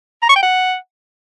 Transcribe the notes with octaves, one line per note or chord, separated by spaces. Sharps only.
A#5
C#6
G5
F#5